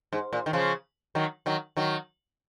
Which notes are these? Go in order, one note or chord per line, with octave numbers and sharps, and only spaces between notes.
G#2
A#2
D#3
C#3 F3
D#3 F#3
D#3 F#3
D#3 F#3